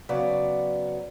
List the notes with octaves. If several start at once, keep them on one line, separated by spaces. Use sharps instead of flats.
C#3 F#3 B3 D5